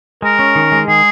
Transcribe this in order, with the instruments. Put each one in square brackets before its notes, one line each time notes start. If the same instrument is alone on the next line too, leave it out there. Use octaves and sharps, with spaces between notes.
[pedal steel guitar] G#3 [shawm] A#4
[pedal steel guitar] C#4
D#3
G#3
[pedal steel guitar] D#3 [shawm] G#4